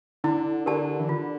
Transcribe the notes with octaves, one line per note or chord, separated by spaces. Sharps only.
D3 E4
D3 G4 A#4 D5 A5
E3
D3 F4